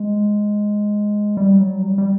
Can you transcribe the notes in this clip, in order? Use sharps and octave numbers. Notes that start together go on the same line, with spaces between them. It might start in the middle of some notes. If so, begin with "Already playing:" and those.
Already playing: G#3
G3
F#3
G3
G3